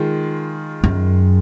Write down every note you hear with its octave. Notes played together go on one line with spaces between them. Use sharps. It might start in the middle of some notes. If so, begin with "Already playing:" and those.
Already playing: D#3 G#3 F4
F#2